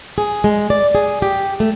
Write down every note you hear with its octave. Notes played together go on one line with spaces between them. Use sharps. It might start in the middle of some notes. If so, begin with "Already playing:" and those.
G#4
G#3
D5
G#4
G4
A3